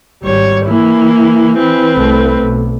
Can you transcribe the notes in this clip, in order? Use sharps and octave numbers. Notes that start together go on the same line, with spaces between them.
G#1 G3 C#5
E3 A#3 E4
C4 B4
C2 A3
B1